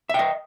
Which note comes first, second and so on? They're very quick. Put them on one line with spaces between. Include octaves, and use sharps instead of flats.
E5 G5 D#5